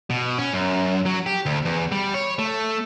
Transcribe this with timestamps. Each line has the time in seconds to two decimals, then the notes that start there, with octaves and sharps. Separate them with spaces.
0.10 B2
0.38 C#4
0.54 F#2
1.06 F#3
1.26 G4
1.46 D2
1.65 E2
1.92 G3
2.14 C#5
2.39 A3